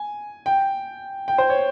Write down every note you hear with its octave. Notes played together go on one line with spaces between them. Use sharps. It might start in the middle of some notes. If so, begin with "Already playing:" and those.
Already playing: G#5
G5
G5
C5
C#5